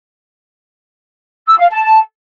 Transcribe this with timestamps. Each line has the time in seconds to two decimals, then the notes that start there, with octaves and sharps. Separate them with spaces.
1.48 E6
1.60 F5
1.71 A5